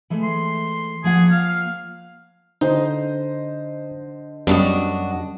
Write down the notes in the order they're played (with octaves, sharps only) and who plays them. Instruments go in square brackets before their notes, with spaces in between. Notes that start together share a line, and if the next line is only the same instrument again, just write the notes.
[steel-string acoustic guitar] E3 G#3 A3
[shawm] C6
[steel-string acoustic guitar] F3 A#3 F#5 [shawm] G#4
[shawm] F5
[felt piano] D3 C5 D#5 [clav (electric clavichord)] D#4
[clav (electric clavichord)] F#2 G3 [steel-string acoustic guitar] D4 F#4 D#5